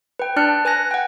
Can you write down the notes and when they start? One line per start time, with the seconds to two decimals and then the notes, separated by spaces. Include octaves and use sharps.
0.19 B4 G5
0.36 D4 D5 A5 F6 F#6 C#7
0.65 B4 G#5 F#6 A#6
0.91 F#5 G5